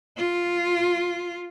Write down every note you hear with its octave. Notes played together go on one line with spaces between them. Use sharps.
F4